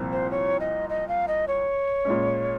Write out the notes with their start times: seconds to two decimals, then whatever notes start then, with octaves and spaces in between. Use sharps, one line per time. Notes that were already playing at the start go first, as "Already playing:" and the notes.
Already playing: C2 A#2 F3 C4
0.12 C5
0.31 C#5
0.60 D#5
0.89 D#5
1.08 F5
1.28 D#5
1.48 C#5
2.05 A#2 G#3 C#4